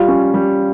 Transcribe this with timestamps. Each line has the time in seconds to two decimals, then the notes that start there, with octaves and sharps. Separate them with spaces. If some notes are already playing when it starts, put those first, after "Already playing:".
Already playing: G3 F4
0.08 C#4
0.34 G3